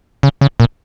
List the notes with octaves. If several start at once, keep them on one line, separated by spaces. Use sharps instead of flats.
C#3
C#3
A#2